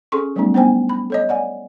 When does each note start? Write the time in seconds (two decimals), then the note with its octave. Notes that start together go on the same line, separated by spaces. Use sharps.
0.12 C#4 G#4 A4 C6 C#6
0.36 F#3 G3 A3 B3 C#4 D#4
0.54 B3 D4 D#4 C5 G5 G#5
0.89 B5
1.10 A4 C#5 D#5
1.29 D5 F#5 G#5